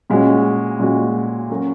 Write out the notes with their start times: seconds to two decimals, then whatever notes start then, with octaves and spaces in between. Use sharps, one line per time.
0.10 A#2 G#3 C#4 F#4
0.79 A#2 G#3 C#4 F#4
1.50 F#3 C#4 F#4 A#4